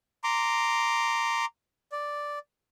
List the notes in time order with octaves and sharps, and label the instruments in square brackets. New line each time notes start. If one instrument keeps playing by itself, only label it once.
[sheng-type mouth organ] A#5 C6 D6
D5